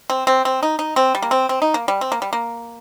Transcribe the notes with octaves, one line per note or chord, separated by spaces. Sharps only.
C4
C4
C4
D#4
D#4
C4
G3
A#3
C4
C4
D#4
A#3
G3
C4
A#3
G3
A#3